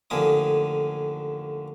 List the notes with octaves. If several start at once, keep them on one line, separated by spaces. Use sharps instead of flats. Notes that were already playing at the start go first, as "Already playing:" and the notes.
A1 F2 D3 A#3 G#5 D#6